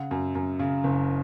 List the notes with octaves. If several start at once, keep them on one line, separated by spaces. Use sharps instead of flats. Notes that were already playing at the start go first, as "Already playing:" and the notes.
Already playing: C#3 F#5
F#2
F#2
C#3
F#1